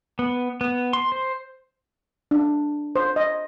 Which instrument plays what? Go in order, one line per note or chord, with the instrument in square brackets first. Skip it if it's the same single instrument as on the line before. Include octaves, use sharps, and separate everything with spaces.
[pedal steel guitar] B3
B3
C6
C5
[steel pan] D4
C5
D#5